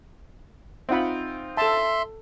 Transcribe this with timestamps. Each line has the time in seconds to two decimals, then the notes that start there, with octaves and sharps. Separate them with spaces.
0.89 C4 D#4 F4 E5 F#5 B5
1.57 A4 E5 A5 C6